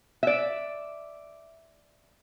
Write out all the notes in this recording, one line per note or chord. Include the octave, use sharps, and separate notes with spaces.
D5 E5